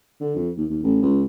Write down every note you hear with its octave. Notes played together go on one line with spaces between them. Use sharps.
D3
F2
D#2
D#2
A1
C#2